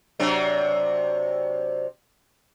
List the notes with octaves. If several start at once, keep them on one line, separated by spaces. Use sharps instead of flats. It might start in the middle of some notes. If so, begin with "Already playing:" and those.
C3 F#3 D4